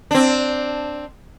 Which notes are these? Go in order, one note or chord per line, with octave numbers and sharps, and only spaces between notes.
C4 D4